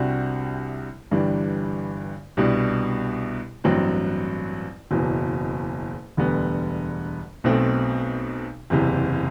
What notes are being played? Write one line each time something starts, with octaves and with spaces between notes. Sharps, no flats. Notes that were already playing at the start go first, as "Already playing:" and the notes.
Already playing: C2 C3 G3 D4 F#4
G1 G2 E3 G3 D4
C2 B2 G3 D4
A1 G2 F#3 C4
F#1 E2 B2 F#3
E1 D2 D3 G3 B3
B1 B2 A3 C4
F#1 E2 C3